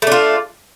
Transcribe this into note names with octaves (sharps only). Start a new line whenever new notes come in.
A3 D4 F4